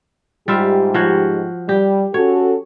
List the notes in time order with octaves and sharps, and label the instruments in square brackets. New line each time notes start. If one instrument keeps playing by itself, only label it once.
[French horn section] G#2 G4 [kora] G3 F4 E5
[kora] F3 F#4 C#5
[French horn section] G3 [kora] G4
[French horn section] C#4 F#4 A4 [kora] C#5